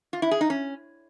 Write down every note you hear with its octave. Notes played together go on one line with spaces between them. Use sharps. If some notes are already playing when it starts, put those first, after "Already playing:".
F4
E4
G#4
D#4
C#4